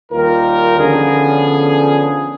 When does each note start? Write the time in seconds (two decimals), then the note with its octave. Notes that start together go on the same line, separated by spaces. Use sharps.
0.11 D#2 G3 D#4 F4 A#4
0.79 D3 F3 B3 C#4 D4 G#4